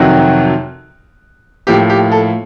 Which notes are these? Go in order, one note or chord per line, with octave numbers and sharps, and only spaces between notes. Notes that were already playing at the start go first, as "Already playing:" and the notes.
Already playing: F2 C3 D#3 F#3 F#4
A2 F3 A#3 G4
G4
A4